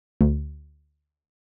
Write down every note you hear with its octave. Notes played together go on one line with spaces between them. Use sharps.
D2